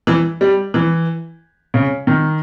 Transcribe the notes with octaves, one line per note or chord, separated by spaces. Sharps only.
E3
G3
E3
C#3
D#3